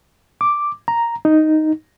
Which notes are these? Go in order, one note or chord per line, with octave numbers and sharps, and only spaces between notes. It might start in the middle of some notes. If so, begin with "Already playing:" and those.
D6
A#5
D#4